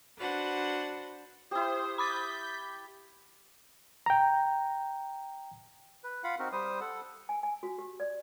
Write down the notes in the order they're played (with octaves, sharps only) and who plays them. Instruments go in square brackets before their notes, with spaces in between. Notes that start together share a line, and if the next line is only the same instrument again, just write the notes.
[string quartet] D4 F#4 B4 C5 F#5
[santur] E4 G4 [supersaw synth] C5 [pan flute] D#6
[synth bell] B5 D6 A6 [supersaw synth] G6 B6
[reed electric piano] G5 A#5
[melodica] B4
F4 F5 F#5 B5
C4 D#4 F#4 A#4
G3 C5 D#6
A4 F#5
[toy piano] G#5
G#5
F#4
G4
D5